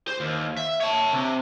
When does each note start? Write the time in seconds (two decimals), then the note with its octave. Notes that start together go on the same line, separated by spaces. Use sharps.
0.08 C5
0.20 D#2
0.57 E5
0.81 C#5 A5
1.13 C3